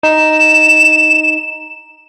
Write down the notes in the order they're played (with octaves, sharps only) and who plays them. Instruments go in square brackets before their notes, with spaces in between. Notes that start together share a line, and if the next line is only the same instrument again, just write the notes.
[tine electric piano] D#4 [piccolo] E7